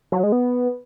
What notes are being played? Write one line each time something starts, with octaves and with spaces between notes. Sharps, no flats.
F#3
G#3
B3